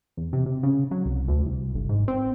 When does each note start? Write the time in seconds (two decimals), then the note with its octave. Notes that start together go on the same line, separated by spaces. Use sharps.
0.17 E2
0.33 C3
0.46 C3
0.63 C#3
0.91 F#3
1.06 C2
1.28 D2
1.46 C2
1.75 G1
1.89 G#2
2.08 C4